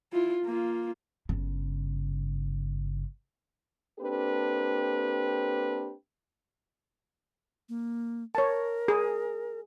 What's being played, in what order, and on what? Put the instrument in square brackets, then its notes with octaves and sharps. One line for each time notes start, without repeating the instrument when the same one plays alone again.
[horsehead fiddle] E4 F4
A#3 F4
[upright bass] G1 C#3
[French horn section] A#3 C4 D4 G4 A4 B4
[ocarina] A#3
[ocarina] A#4 [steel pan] C#5 A5
[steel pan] G#4